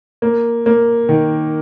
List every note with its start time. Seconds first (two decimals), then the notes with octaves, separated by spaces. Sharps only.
0.22 A#3
0.66 A#3
1.09 D#3